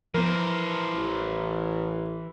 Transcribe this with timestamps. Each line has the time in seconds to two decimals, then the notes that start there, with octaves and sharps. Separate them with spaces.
0.14 E3 F3 B3 A#4 C5
0.95 A1